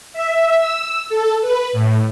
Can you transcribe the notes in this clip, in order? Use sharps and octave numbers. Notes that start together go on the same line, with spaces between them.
E5
E6
A4
B4
A2